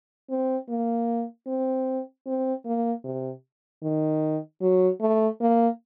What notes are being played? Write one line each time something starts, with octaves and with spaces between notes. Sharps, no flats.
C4
A#3
C4
C4
A#3
C3
D#3
F#3
A3
A#3